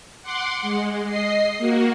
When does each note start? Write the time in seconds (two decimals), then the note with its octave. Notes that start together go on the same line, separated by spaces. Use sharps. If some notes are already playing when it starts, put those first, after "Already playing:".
0.22 F#5 C6 D6
0.62 G#3
1.06 D#5 C7
1.58 A#3 F#4